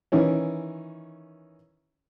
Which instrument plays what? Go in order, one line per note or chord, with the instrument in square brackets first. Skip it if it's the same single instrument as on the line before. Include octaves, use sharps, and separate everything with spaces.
[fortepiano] D#3 E3 C#4